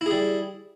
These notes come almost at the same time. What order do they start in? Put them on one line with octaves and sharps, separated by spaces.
E4 G#4 G3